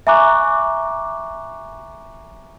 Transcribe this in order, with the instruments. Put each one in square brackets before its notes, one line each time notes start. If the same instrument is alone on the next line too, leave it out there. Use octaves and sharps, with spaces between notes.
[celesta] E5 G#5 A#5 C#6 D6 F#6